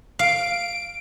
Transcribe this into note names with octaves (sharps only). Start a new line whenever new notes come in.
F5 D7